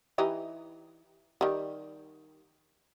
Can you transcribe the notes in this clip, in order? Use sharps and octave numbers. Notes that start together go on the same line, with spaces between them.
E3 D#4 G4
D#3 G3